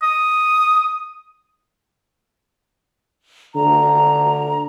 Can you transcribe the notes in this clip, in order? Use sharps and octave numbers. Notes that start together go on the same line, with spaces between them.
D#6
D3 A#5